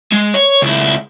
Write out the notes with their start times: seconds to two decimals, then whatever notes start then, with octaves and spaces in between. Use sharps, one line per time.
0.12 G#3
0.34 C#5
0.62 C#2 E4